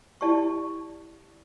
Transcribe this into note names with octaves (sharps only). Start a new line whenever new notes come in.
E4 G4 D5 A5 C#6